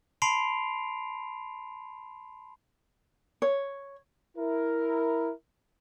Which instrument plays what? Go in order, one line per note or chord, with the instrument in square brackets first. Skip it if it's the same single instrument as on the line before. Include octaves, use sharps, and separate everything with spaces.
[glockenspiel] A5 B5 C6 C7 D7 F7
[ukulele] C#5
[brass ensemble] E4 A#4